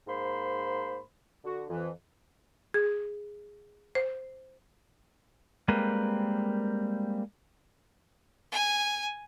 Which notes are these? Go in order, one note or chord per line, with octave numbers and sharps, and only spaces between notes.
G#2 A#3 C5 B5 C6
D3 F#4
F2 E3
G#4
C5
G3 G#3 A#3 C4 A#4 B4
G#5